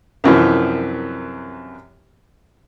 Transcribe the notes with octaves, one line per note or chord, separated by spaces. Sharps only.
C2 F#2 E3 F3